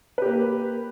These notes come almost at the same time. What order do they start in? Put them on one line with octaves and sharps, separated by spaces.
B4 G4 A#3